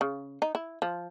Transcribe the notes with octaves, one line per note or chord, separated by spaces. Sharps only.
C#3
D#4
E4
F3